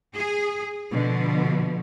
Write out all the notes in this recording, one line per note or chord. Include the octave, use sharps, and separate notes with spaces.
G#4
B2 D3 F3